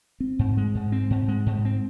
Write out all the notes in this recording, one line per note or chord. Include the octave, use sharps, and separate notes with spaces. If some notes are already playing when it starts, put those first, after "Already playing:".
C4
G#2
G#3
G#2
C4
G#2
G#3
G#2
C4